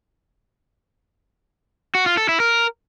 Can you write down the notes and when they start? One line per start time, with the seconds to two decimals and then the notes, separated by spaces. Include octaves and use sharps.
1.95 F#4
2.06 F4
2.17 A4
2.29 E4
2.40 A#4